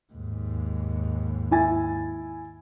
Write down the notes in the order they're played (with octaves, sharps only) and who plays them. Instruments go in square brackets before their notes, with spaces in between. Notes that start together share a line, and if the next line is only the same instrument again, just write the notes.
[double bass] D#2 G#2
[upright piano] E4 G#5 A6